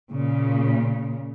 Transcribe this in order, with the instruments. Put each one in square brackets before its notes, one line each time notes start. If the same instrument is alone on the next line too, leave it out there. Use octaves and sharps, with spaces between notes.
[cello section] A#2 C#3